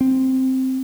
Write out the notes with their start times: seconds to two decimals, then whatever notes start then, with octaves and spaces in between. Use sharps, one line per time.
0.01 C4